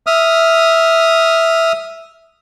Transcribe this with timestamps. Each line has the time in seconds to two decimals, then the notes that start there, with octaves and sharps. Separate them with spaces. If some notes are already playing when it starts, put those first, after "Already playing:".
0.07 E5 D#6 F6